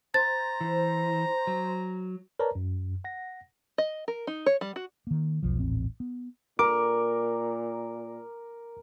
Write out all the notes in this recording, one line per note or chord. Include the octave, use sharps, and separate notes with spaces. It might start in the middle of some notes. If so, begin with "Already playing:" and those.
C5 A#5 A6
E3
F#3
A#4 B4 C#5 D5 A5 A#5
F#2
F#5 A#6
D#5
A#4
D#4
C#5
G3
F#4
D#3 A#3
E1 B1 F3
D#1 A1 C4
B3
A#2 A#4 D6